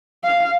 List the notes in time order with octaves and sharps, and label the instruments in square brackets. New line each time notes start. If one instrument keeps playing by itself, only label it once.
[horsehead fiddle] F5